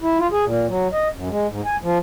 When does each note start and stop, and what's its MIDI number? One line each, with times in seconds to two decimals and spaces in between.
0.02 0.18 64
0.19 0.27 65
0.32 0.45 68
0.45 0.67 46
0.67 0.88 54
0.93 1.08 75
1.16 1.29 42
1.30 1.47 56
1.49 1.61 44
1.65 1.76 80
1.83 1.98 53